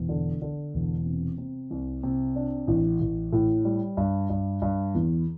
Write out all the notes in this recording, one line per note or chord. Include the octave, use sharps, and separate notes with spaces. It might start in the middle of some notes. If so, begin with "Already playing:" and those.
Already playing: E1
D3
D3
E1
C3
C3
C2
C3
D4
A1
A1
A2
G3
G2
G2
G2
E2